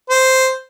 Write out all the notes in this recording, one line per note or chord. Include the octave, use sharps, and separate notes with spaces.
C5